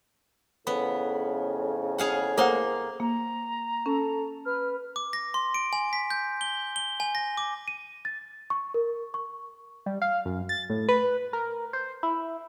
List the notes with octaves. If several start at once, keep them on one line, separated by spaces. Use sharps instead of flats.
F2 A2 C#3 B3 B5
G#4 F5 F#5
A#3 A4 C5 F#5 C6
A#3 A#5
C#4 A4
B4 F6
D6
A#6
C6
D7
G#5
B6
G6
G7
G7
G#5
A#6
D6
D#7
A6
C#6
A#4
C#6
G3
F5
F#2
A6
A2
B4
A#4
C5
E4